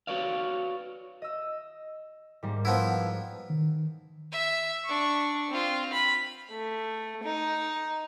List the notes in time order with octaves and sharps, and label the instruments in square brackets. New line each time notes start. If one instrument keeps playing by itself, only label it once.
[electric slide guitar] F#4 B4 C#5 D5 F5
[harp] D#5 E6
G#2 G3 A#3
[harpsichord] F3 B3 E4
[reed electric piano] D#3
[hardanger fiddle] E5
D4 C#6
C4 F4
B5
A3
D#4